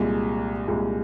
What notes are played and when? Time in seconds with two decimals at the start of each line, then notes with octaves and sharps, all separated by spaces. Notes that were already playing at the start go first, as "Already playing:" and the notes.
Already playing: C2 A#2 G#3
0.67 C2 A#2 G#3